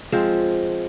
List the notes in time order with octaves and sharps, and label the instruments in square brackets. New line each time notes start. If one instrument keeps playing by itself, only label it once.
[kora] F3 G#3 C4